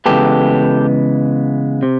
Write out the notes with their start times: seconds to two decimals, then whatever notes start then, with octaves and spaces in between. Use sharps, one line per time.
0.06 C#3 E3 G#3 B3 G4 A4
1.83 C3